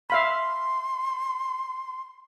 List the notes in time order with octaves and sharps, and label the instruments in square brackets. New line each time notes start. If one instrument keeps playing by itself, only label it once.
[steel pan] E5 F5 B5 [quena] C6